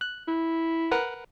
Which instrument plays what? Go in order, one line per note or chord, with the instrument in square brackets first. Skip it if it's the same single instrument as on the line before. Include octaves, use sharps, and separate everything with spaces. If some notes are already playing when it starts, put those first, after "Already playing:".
[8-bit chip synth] F#6
[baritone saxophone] E4
[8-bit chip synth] A#4 B4 F#5